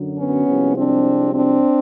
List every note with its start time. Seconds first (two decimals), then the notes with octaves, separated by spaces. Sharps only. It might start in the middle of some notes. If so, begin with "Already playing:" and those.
Already playing: F#2 D3 F#3
0.18 B3 C#4
0.46 C2 C3 F3 G#3
0.76 C4 D4
1.34 C4 D4